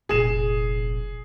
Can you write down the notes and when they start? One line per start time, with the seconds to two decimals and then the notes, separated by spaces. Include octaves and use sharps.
0.09 F1 A#1 G#4 E7